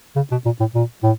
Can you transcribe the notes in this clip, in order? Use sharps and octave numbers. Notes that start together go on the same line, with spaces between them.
C#3
B2
A#2
A2
A#2
A2